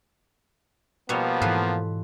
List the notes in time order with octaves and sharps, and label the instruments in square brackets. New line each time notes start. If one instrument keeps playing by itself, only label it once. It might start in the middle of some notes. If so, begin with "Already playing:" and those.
[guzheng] B2 G3 C#5 [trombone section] F3 A#3 B3
[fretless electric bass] G#2 E3 [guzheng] F4 A4 B4